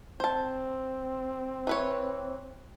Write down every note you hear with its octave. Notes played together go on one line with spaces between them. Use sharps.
C4 C5 A5
E3 B4 C#5